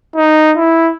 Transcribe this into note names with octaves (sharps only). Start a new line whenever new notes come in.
D#4
E4